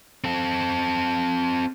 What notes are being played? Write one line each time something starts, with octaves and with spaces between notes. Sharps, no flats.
C4 A4